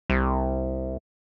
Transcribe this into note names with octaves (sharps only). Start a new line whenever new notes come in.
C2